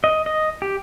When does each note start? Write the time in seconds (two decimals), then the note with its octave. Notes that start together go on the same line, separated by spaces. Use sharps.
0.04 D#5
0.26 D#5
0.62 G4